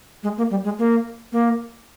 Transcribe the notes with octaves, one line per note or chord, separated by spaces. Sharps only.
G#3
A#3
G3
G#3
A#3
A#3